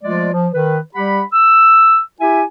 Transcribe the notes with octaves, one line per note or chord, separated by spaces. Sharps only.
F3 G#3 A3 F4 D5
F3
D#3 B4
G3 G4 F#5 B5
E6
E4 G4 E5 G#5